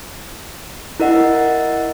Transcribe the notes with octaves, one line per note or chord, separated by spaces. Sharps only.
E4 A#4 D#5 F#5